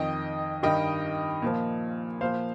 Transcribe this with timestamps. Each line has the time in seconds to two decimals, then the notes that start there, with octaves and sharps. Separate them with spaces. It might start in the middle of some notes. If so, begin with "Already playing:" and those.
Already playing: F2 D#3 D#5 G5
0.63 G2 D#3 D#5 G5
1.42 A#2 F3
2.21 A#2 F3 C5 F5